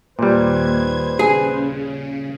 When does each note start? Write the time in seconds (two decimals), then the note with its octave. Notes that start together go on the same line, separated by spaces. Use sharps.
0.19 D#2 A#2 G3 B4 C5 G#6
1.19 C#3 G#4